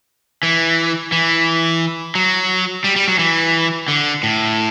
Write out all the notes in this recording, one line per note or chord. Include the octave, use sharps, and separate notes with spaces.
E3
E3
F#3
G3
G3
F#3
E3
D3
A2